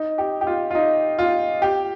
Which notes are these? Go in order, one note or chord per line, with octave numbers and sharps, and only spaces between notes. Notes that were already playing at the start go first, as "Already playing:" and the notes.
Already playing: D#4
G4
G4
F4
F4
D#4
F4
G4